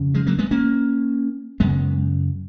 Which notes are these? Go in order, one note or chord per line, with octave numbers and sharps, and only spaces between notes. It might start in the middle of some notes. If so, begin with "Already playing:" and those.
Already playing: F2 C#3
F3 G#3
F#3 A#3
G#3 B3
A#3 C#4
F#2 C#3 G#3 B3